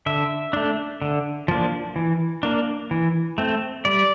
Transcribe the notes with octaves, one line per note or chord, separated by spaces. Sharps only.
D3 E5
A3 D4
D3
F3 A#3 D4
E3
A#3 D4
E3
A3 C4
G3 D5